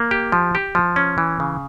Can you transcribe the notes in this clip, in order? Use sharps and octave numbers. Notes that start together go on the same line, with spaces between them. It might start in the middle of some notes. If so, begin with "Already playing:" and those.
Already playing: A#3
G4
F3
G4
F3
C#4
E3
C#3